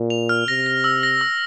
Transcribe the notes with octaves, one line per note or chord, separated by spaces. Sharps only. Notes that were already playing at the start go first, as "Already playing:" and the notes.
Already playing: A#2
F7
F6
C3 A#6
A#6
E6
A#6
E6